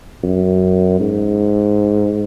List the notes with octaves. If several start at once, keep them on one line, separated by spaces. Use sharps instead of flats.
F#2
G#2